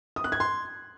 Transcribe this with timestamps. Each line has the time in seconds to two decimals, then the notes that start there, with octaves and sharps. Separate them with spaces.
0.16 D#6
0.24 F#6
0.32 G#6
0.40 C6